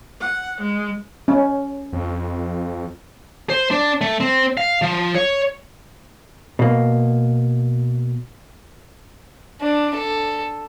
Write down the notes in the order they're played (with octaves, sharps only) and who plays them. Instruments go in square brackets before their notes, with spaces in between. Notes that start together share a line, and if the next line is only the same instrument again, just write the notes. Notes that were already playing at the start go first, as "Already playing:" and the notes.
[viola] F#5
G#3
[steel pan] C#4
[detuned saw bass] F2
[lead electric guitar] C5
D4
A3
C4
F5
F3
C#5
[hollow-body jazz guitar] B2 A#3
[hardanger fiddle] D4
A4